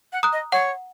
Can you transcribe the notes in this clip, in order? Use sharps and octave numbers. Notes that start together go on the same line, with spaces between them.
F#5
A#5 D#6 F#6
D#5
C#5 F#5